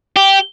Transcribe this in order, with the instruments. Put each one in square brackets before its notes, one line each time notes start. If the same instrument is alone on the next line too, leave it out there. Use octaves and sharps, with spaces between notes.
[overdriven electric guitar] G4